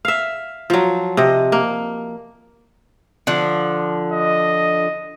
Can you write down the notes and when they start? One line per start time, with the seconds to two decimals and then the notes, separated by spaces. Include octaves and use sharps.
0.05 E5 F5
0.70 F3 F#3
1.17 C3 D#5
1.52 A#3
3.27 D3 F3
4.12 D#5